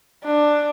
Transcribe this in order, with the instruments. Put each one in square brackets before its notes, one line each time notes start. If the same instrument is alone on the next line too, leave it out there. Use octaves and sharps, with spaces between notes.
[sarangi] D4